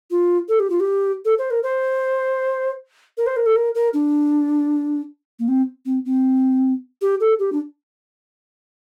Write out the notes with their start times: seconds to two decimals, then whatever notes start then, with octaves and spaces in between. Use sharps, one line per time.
0.11 F4
0.49 A4
0.59 G4
0.70 F4
0.80 G4
1.25 A4
1.38 C5
1.51 A#4
1.63 C5
3.17 A#4
3.26 C5
3.36 A#4
3.46 A4
3.56 A#4
3.75 A#4
3.93 D4
5.39 A#3
5.48 C4
5.85 C4
6.05 C4
7.02 G4
7.20 A4
7.39 G4
7.52 D4